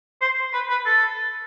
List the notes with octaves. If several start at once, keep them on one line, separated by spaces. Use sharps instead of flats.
C5
B4
B4
A4